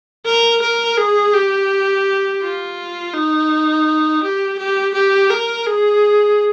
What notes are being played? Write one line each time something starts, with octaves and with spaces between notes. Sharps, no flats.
A#4
A#4
G#4
G4
F4
D#4
G4
G4
G4
A#4
G#4